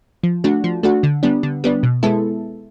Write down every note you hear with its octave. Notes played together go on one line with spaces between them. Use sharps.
F3
A3 D4 F#4
F3
A3 D4 F#4
D3
G3 B3 D4
D3
G3 B3 D4
B2
G#3 B3 E4 A4